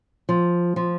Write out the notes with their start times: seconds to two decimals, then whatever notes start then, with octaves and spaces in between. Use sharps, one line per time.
0.29 F3
0.76 F3